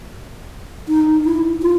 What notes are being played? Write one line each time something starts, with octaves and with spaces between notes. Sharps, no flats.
D#4
E4
F4